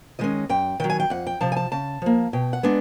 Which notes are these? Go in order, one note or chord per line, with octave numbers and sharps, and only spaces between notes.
D#3 G#3 C#4 D#5
F#2 G5
D#3 F#3 G5
G#5
G5
F2 F#5
G5
C3 F3 A5
G#5
A5
C#3 A5
F3 A#3
B2 G5
F#5
G#3 B3 D4